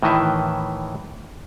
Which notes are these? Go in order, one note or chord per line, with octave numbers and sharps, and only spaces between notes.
A2 D#3 E3 D#5 E5